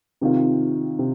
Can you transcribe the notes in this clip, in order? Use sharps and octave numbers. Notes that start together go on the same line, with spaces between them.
C3 D#3 C4 F4
C3